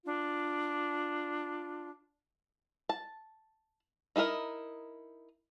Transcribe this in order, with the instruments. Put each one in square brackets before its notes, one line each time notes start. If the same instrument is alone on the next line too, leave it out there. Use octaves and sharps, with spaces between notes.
[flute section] D4 F4
[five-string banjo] A5
D#4 E4 G#4 A#4 D#5